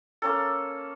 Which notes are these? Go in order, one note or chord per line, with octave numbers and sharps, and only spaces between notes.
A#3 C#4 A4